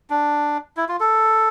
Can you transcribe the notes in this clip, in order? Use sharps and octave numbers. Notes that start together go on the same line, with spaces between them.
D4
E4
F4
A4